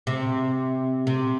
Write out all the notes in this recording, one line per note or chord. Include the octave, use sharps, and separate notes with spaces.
C3
C3